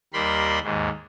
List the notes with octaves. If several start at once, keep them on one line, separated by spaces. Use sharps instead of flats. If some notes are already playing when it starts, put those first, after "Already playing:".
D#2 G3 A#4 B5 C6
D#2 G#2